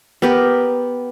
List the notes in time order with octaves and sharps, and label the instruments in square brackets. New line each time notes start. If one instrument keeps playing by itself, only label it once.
[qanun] B3 G4 A#4